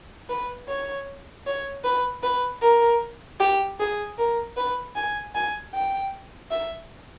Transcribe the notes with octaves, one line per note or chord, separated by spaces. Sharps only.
B4
C#5
C#5
B4
B4
A#4
G4
G#4
A#4
B4
G#5
G#5
G5
E5